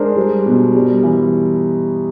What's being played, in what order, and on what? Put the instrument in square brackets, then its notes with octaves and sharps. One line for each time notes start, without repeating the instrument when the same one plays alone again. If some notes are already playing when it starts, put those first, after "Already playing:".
Already playing: [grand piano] G#3 D4 A#4 C5
G3
B2
G3
E3